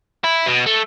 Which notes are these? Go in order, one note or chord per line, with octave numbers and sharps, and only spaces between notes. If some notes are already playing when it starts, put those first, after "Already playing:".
E4
B2
A3